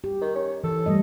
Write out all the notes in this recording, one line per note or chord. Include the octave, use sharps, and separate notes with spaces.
G4
D#3
C#4
E3 A4
G3 A3 D#5